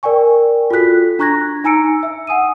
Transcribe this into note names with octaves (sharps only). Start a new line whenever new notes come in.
A#4 D5 G5 G#5 C#6
F4 F#4 A4 F#6 B6
D4 A#5 C#6 F#6 G#6 A#6
D#4 G#5 A#5 E6 C#7 D7
E5 E6
F#5 G#5 D#6 D#7